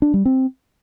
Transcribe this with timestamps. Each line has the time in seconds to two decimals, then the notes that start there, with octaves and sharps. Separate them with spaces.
0.02 D4
0.14 G3
0.25 C4